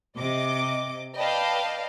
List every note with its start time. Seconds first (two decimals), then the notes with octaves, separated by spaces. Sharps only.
0.16 C3 D#5 D6
1.18 B4 D5 D#5 F5 G5 A5